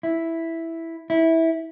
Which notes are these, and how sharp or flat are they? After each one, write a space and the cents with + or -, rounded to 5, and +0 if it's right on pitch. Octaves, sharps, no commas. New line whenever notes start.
E4 +0
E4 -15